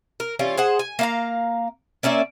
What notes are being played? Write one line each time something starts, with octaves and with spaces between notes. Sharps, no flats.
A#4
E3 G3 C#4 F4
G#4 C5 F#5
G#5
A#3 F5 A#5
A#3 C#4 D5 E5